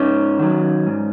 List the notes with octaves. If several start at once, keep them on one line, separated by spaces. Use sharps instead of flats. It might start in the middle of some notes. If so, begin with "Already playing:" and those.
Already playing: G#2 C#4 D#4
D#3 F#3
G#2